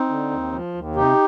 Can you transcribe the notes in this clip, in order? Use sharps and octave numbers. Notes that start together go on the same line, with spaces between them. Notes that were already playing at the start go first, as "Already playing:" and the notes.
Already playing: C4 D#4
D3
D#2
F3
D#2
C3 D#4 G4